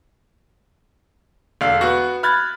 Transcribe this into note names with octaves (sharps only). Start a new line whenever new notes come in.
E1 D3 F5
B3 F#4
B5 F6 F#6 G#6 A6